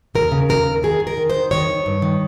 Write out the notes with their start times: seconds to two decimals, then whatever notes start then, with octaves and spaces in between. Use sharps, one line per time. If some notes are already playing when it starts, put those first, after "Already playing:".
0.15 D#2 A#4
0.32 C#3
0.49 D#2 A#4
0.67 D#2
0.83 D#3 G#4
1.00 D#3
1.07 A#4
1.17 D#3
1.30 D#3 C5
1.51 D#3 C#5
1.68 D#3
1.86 G2
2.02 D#3